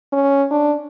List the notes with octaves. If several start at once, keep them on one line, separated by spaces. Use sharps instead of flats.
C#4
D4